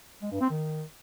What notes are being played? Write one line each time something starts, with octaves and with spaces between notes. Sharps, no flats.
G#3
G2
C4
D#3